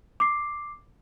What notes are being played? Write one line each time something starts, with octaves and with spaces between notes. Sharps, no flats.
D6 C7